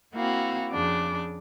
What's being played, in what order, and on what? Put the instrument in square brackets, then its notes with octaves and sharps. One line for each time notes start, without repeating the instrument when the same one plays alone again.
[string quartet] A#3 C4 E4 F#4 F5
F2 C#3 D4 D6